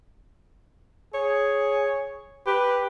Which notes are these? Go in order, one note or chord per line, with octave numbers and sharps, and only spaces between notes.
G#4 C#5
G4 B4